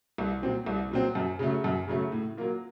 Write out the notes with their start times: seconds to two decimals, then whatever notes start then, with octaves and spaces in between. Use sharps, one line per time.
0.18 C2
0.42 A#2 F#3 C4
0.66 C2
0.92 A#2 F#3 C4
1.15 F#2
1.39 C#3 F#3 A3
1.64 F#2
1.88 C#3 F#3 A3
2.12 A2
2.37 F#3 A#3 F4